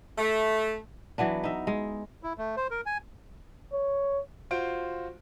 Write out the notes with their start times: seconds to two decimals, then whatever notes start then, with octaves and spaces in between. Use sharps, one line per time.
0.17 A3
1.18 E3 F#3 B3 D4
1.43 D#4 E5
1.67 G#3
2.23 E4
2.38 A3
2.57 C5
2.71 A#4
2.86 G#5
3.73 C#5
4.51 F4 F#4 C5 D7